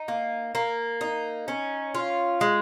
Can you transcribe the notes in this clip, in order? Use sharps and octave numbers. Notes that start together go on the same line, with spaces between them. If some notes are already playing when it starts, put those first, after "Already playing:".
Already playing: D#4
A#3
A#3
D#4
C#4
F4
G#3